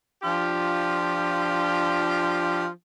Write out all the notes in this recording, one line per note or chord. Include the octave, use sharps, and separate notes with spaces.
F3 D4 F4 G4